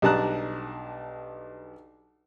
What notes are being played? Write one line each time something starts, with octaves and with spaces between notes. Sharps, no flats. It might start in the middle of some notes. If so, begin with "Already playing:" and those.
B1 G3 D4 A5 A#5 F#6